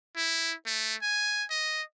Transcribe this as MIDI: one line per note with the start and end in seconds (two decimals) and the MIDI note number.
0.16 0.55 64
0.66 0.95 57
1.02 1.44 80
1.50 1.82 75